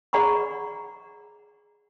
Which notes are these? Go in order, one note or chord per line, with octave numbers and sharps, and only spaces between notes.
G#4 D5 F#5 A#5 B5 C#6